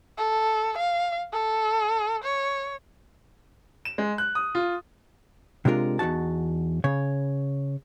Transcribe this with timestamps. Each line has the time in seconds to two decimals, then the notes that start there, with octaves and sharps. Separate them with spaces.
0.18 A4
0.78 F5
1.33 A4
2.24 C#5
3.85 E7
3.98 G#3
4.18 F#6
4.35 D#6
4.55 F4
5.65 C3 G#3 D4 F4 A#4
5.99 E2 A#3 D#4 F#4 A5
6.84 C#3 C#5